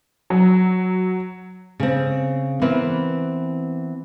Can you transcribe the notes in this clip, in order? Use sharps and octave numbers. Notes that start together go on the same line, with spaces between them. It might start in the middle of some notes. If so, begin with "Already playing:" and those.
F#3
C#3 C4
E3 B3 C4 E4 A#4 B4